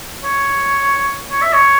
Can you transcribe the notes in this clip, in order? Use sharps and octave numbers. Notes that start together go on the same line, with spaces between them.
C#5
C#5
E5
C#5